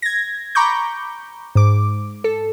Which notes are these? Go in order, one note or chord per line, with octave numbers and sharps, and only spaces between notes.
G#6 A#6
A#5 B5 C#6 D6 G6
G#2 D6
A4